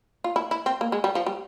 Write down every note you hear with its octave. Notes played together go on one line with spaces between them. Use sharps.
F4
E4
E4
C4
A#3
G#3
G3
F3
G3